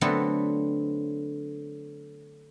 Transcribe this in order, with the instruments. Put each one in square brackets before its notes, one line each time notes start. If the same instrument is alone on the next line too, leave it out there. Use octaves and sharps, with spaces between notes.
[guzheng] D3 F#3 A3 B3 C4